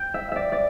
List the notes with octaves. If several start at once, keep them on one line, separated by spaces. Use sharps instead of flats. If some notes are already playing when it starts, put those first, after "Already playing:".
Already playing: G5
E5
D5 E5
D5